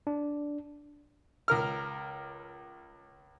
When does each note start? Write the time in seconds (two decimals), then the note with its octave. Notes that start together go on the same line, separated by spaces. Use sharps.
0.07 D4
1.48 C#2 A#4 F6